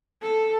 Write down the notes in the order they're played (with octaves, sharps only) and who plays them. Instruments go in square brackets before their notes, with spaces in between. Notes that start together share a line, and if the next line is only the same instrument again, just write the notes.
[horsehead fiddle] A4